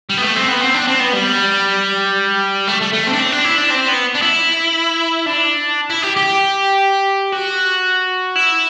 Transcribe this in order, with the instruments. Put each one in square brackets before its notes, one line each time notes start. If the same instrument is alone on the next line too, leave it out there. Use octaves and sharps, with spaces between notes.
[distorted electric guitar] G3
B3
A3
C4
B3
C4
D4
C4
B3
G3
A3
A3
A3
C4
D4
C4
D4
E4
D4
C4
B3
D4
E4
D4
E4
G4
G4
F#4
E4